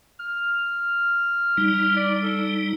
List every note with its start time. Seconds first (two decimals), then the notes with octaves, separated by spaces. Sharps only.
0.20 F6
1.57 G3 D#4
1.97 D5
2.23 A4